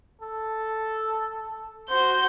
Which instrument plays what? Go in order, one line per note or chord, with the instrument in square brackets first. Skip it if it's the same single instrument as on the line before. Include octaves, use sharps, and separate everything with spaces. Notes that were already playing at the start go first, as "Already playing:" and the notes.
[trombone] A4
[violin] F#4 G6 [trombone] C5